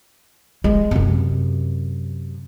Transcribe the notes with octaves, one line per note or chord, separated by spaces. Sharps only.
G#3
F#2 C3